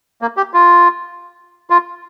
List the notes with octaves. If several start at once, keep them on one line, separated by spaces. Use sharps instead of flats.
A#3
G4
F4
F4